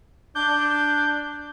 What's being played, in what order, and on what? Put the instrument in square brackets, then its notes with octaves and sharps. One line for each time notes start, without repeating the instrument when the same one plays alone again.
[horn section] D4 [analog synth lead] G6